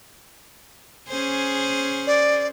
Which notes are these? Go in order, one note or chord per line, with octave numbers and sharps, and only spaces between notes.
C#4 G#4 C5
D5